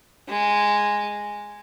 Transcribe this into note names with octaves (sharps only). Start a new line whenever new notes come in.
G#3